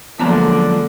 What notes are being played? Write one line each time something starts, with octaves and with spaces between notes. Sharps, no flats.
F#2 D3 F3 G#3 A#3 B3 D4 A#5